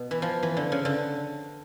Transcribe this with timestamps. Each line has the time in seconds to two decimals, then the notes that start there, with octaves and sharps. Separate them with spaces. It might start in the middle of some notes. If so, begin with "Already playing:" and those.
Already playing: B2
0.11 E3
0.22 F3
0.43 E3
0.57 D3
0.72 C#3
0.85 D3